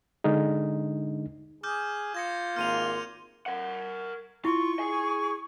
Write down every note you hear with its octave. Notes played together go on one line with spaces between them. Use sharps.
D3 G#3 D4 D#4
G#4 D6 F6 G6
F4 G#6 A#6 C#7
G#1 A#3 C6 F6 D#7 F7
A#4 F#5
E4 F4 C#6
G#4 G#5